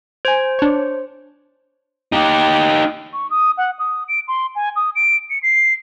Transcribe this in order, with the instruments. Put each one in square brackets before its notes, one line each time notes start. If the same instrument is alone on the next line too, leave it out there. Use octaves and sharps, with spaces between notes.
[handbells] C5 [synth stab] G#5 G#6
[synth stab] D4 C#5
[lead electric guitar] D#4 G4
[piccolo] C#6
D#6
F#5
D#6
D7
C6
G#5
D#6
D7
C#7
C7